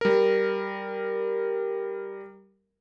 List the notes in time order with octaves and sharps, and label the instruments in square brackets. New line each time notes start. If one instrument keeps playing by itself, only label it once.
[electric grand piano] G3 A#4